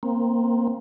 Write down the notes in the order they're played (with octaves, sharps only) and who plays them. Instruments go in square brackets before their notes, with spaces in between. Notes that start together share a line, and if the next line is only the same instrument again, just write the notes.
[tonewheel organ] A#3 C4